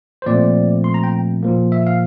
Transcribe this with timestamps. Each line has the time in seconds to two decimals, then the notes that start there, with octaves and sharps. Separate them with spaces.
0.22 C5
0.26 A#2 F3 A3 C4 D5
0.84 C6
0.94 A#5
1.04 G5
1.43 A#2 F3 A#3
1.72 E5
1.87 F5